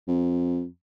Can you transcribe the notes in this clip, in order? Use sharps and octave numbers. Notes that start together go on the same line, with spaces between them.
F2